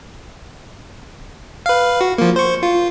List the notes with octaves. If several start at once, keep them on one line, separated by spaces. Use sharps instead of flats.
B4 F5
F#4
F3 A#3
C5 C#6
F4